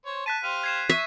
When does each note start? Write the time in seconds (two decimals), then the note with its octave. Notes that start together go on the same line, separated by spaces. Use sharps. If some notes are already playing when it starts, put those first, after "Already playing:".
0.06 C5 C#5
0.26 A5 F#6 B6 D#7
0.44 G4 C5 F5 D#7
0.64 G#6 C7 E7
0.90 E5 C#6